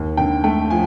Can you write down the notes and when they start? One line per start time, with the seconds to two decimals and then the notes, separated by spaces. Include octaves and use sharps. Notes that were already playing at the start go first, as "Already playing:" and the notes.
Already playing: D#2
0.17 D3 G5
0.44 A3 G5
0.70 F3 G#5